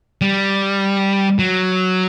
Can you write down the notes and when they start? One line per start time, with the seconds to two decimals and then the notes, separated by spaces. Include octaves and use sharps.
0.22 G3
1.39 F#3